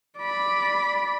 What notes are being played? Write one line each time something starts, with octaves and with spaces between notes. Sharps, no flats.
D5 B5